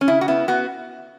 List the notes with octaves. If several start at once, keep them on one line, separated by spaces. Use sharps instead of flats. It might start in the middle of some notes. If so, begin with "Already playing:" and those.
C#4
C#3 E4
F#4
B3 E4
B3 F#4